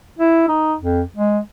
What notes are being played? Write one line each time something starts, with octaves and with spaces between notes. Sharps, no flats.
E4
D#4
F2
G#3